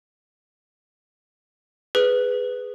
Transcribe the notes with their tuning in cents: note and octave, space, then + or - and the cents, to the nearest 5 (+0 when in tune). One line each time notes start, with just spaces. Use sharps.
G#4 +0 B4 +15